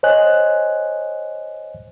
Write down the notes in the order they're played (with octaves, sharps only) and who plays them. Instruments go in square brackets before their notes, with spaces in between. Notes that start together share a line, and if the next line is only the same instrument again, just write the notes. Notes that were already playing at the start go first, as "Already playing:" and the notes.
[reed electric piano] C5 C#5 D#5 G#5 F#6